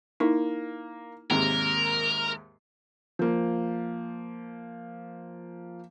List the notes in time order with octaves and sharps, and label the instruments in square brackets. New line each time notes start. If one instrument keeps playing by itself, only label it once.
[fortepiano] A#3 [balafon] D#4 E4
[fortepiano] D#2 G#2 C3 [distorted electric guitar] A#4
[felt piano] F3 A#3